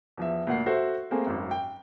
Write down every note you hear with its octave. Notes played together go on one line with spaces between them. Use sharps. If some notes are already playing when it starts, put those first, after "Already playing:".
E2 F3 E5
D2 A#2 F#5 C7
F#4 A4 C5 E5
A3 A#3 C4 G#4
G#1 F#2
G5